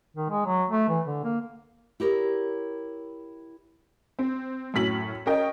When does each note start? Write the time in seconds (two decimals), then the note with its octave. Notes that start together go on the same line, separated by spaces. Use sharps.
0.17 D#3
0.30 G#3
0.46 F#3
0.69 A3
0.89 E3
1.05 D3
1.24 A#3
2.00 E4 G4 A#4 C#5
4.19 C4
4.74 F#2 A2 C#4 B6 F#7
5.26 C#4 A#4 D#5 G5